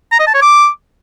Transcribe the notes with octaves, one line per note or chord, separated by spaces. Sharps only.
A#5
D#5
A5
C#5
D6